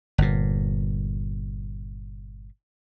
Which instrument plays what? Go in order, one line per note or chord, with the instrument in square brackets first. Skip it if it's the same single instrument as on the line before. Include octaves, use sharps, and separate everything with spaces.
[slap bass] G1 A#2